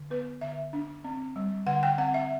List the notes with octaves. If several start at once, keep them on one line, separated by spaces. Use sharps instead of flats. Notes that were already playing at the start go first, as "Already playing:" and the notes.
Already playing: D3
B3 B4
D3 E5
D4
C4
G3
D3 F#5
G5
C4 F#5
E5